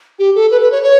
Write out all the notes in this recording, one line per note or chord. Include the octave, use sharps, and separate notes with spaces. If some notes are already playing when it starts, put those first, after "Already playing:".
G4
A4
B4
B4
C#5
C#5